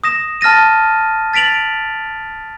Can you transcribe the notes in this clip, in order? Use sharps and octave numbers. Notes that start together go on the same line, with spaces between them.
D#6 A#6 E7
A5 F6 A6 A#6 D#7
A6 B6 D7 F7 F#7